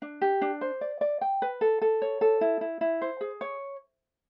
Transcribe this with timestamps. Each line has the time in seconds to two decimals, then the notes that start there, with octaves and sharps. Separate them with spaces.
0.02 D4
0.21 G4
0.41 D4
0.61 C5
0.81 D5
1.01 D5
1.21 G5
1.42 B4
1.61 A4
1.81 A4
2.02 C#5
2.21 A4
2.41 E4
2.61 E4
2.81 E4
3.01 C5
3.21 G#4
3.41 C#5